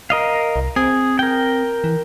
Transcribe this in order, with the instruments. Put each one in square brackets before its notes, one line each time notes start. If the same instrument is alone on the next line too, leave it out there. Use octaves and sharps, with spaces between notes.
[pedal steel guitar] A#4 D#5 F5
[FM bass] C2
[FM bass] C4 [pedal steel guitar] G#4
[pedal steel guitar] A#4 G5
[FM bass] E3